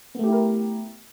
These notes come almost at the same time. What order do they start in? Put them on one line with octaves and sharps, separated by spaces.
B3 A3 G4 E4 A#4